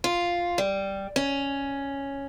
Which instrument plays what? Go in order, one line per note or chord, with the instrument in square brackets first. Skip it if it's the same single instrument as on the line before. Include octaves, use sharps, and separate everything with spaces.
[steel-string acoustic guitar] F4
G3
C#4